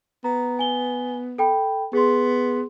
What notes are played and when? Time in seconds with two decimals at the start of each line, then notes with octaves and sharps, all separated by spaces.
0.24 B3 A#5
0.59 G#5 G7
1.38 A4 G5 B5
1.93 B3 G#4 C6